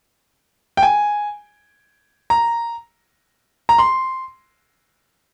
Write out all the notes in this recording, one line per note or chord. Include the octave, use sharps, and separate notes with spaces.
G5
G#5
A#5
A#5
C6